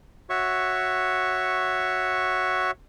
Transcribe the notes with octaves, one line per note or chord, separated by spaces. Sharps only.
F#4 C#5 E5 C#6